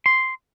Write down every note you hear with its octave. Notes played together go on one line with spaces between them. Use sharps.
C6